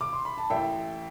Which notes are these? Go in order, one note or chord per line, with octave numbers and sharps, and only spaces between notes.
D6
C6
B5
A5
A1 E5 G5